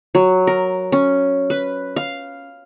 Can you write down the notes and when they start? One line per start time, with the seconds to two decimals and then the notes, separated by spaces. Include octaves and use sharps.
0.15 F#3
0.47 A#4
0.92 C#4
1.50 B4
1.96 F5